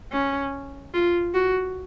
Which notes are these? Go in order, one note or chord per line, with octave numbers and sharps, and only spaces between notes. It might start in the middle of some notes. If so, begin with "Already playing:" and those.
C#4
F4
F#4